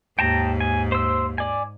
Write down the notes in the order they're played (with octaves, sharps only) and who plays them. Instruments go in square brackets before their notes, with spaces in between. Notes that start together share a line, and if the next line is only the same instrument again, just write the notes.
[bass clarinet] D#2 [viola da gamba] G#2 [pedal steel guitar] G5 A5 A#5
[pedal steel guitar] G#5
C5 E6
D5 G#5